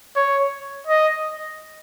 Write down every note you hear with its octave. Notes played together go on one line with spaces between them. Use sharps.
C#5
D#5